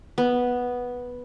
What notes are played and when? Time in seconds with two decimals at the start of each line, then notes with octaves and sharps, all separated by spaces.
0.18 B3